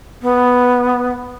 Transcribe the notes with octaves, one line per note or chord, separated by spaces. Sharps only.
B3